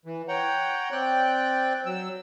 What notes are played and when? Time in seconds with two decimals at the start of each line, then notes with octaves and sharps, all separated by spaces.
0.06 E3
0.28 C#5 F#5 G5 A#5
0.92 C4 D5 G5 F#6
1.86 F#3 E6